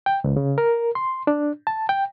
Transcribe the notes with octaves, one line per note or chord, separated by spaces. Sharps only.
G5
C#2
C#3
A#4
C6
D4
A5
G5